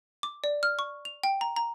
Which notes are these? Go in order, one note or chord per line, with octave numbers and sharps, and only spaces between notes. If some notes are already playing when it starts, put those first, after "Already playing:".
D6
D5
F6
C#6
F7
G5
A#5
A#5